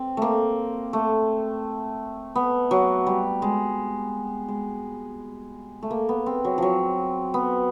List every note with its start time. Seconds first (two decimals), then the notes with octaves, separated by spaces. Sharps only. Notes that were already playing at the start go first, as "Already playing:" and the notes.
Already playing: C4
0.17 A3 A#3
0.93 A3
2.35 B3
2.71 F#3
3.07 G3
3.42 G#3
4.48 G#3
5.83 A3
5.91 A#3
6.09 B3
6.26 C4
6.45 F#3
6.58 F3 F#3
7.34 B3